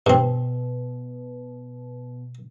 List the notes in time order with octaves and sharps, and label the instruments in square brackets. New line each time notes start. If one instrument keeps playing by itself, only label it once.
[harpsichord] G2 C4 [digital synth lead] B2